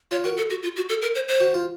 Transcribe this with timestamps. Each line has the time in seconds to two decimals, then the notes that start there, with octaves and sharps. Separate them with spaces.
0.11 F4 C#5
0.24 F#4 A#4
0.37 A4
0.50 F#4
0.63 F4
0.76 F#4
0.89 A4
1.02 A#4
1.15 C5
1.28 C5
1.40 F#4
1.54 F4